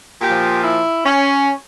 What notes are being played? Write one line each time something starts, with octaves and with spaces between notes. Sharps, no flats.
A#2 F3 G4
E4
C#4